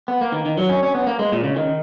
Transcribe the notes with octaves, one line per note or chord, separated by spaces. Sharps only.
B3
A#3
D#3
D#3
F#3
C#4
C#4
B3
A#3
G#3
A#2
C#3
D#3